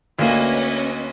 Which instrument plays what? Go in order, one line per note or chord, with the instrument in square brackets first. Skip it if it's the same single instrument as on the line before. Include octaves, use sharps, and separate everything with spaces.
[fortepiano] D2 A#3 [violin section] C#4 B4 D#5